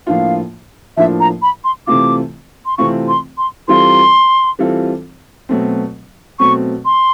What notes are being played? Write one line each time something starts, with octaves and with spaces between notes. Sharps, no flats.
A2 F3 A#3 D4 F4 F5
A2 F3 A#3 D4 F4 E5
A#5
B5
C6
C3 E3 A3 C4 F4 D6
C6
C3 E3 A3 C4 F4 C#6
C6
C6
E3 G3 C4 F4 A4 C6
E3 G3 C4 F4 A4
B2 F#3 A3 C4
B2 F#3 A3 C4 C#6
C6